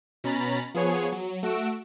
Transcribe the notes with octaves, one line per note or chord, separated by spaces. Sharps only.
B2 C#4 A#5 B5 A6
F3 B3 G#4 C#5
F#3
A3 F#4 E6 D7